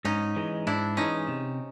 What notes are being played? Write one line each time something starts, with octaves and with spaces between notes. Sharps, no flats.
G#2 C#4 D#4
E3 G#3
G#2 D4 E4
E3 G#3 C#4 D#4
C3